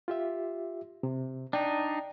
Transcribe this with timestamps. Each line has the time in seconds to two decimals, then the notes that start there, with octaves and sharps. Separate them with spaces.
0.08 F4 G4 E5
1.03 C3
1.53 D4 D#4 D5 G5